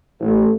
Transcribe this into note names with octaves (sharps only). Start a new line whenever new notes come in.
A1